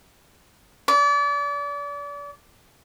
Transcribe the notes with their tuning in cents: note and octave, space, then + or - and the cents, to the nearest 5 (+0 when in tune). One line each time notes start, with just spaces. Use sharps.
D5 -35